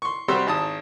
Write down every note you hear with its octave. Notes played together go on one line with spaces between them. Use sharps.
C6 C#6
C3 G3 F#4 G4 C5 E6
G#1 A5 D#6